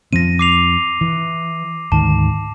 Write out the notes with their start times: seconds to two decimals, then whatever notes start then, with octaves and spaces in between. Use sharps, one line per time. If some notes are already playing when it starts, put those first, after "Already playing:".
0.13 F2 F3 C4 A#6 D#7
0.39 D6 C7 F7
1.01 E3
1.92 D2 G#2 D#3 A5